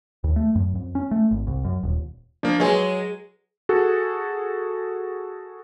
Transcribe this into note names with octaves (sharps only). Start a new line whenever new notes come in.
D#2
A3
F#2
F2
C#4
A3
G#1
C2
F#2
D#1
F3 A#3 D4
F#3 G#3 G#4 B4 C#5 G#5
F#4 G#4 A4